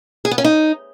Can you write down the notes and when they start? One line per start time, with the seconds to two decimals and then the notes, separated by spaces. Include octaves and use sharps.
0.25 G#4
0.31 B3
0.38 C#4
0.45 D#4